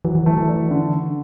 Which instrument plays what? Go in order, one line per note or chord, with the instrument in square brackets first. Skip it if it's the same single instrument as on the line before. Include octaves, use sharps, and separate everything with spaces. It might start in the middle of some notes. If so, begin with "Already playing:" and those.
[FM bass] E3 [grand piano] F#3
[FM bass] E3
[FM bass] E3 [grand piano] A3
[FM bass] E3
[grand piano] D4
D3